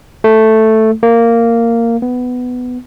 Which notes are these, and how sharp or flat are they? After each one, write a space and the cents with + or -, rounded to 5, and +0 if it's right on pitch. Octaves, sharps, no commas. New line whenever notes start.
A3 +0
A#3 -10
B3 +10